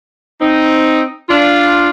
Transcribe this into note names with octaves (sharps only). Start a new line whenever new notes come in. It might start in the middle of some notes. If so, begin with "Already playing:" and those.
C4 D#4
D4 F4